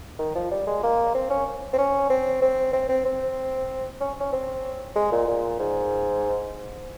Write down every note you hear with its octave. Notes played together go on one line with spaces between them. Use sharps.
D#3
F3
G3
G#3
A#3
C4
C#4
C4
C#4
C4
C4
C4
C4
C4
C#4
C#4
C4
G#3
A#2
A#2
G#2